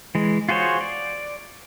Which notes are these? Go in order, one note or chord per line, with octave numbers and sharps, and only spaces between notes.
E3 G#3
F4 F#4 G#4 C5 C#5
D5